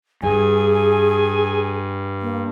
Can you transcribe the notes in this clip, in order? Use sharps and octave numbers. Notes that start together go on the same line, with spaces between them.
G2 G#4 G#5
A#3